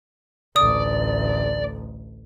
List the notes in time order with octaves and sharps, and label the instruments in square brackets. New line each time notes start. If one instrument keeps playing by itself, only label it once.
[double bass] A1 D2 [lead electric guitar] D5 [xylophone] D#6